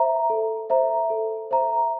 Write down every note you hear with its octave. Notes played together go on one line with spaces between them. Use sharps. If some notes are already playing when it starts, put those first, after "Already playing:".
Already playing: C5 E5 A#5
A4
C5 E5 A#5
A4
C5 E5 A#5